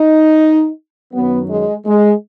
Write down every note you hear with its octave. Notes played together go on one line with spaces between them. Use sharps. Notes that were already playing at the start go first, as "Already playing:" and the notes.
Already playing: D#4
F#2 D#3 F#3 B3
G#3
G#3